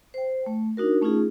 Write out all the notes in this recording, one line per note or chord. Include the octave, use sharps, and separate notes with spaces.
C5 G5
A3
D4 D#4 F#4 A#4
A3 C#4 D#4 F4 G#4